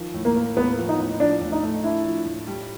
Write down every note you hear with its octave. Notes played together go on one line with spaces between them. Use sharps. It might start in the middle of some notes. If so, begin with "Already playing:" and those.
Already playing: D#3 F3
A2
A#3
A#3
A2 B3
F3
D#4
A2
F3 D4
A2
D#4
A3
D4 E4
F3
A2
G3